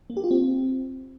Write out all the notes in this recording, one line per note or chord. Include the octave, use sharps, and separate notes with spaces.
A#3
G4
F4
C4